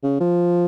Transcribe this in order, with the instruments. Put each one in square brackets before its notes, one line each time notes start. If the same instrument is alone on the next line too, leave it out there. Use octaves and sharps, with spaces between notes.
[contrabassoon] C#3
F3